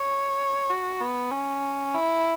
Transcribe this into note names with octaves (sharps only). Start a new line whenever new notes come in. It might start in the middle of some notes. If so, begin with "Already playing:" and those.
Already playing: C#5
F#4
B3
C#4
E4